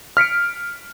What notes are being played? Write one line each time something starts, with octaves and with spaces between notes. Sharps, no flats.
F6 B6 C#7 D7